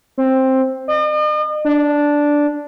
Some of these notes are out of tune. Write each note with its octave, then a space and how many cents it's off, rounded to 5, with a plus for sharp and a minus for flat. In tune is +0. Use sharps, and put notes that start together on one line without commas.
C4 +10
D#5 -45
D4 -5